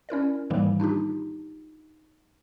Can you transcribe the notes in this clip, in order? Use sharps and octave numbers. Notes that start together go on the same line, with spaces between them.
C#4 E4 A#4 D5
G#2 D#3 E3 G3 A#3
D4 D#4 F4 G4